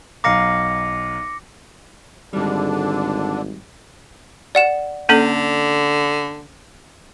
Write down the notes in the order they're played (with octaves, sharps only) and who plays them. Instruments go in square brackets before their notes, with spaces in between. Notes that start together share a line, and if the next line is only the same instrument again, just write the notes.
[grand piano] B1 F5 A#5 [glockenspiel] D6 A#6 C#7
[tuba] G#1 [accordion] D3 D4 [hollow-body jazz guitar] G3 G#3
[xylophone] D5 F#5 E7
[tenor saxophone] D3 [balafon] A#3 C#4 A4